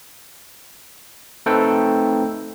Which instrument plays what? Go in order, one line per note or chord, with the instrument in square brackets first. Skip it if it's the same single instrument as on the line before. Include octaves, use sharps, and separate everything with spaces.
[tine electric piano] A3 C4 D#4 A4 B4 G5